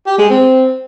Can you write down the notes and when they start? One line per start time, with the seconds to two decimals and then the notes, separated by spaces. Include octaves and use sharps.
0.06 G4
0.18 G#3
0.30 C4